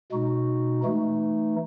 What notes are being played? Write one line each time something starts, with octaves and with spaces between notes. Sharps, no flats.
B2 G#3 D#4 F#4
E3 A3 D#4